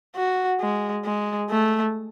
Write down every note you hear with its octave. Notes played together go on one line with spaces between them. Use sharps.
F#4
G#3
G#3
A3